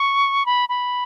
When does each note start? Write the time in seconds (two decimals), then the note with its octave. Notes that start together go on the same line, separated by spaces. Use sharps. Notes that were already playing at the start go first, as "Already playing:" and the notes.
Already playing: C#6
0.46 B5
0.69 B5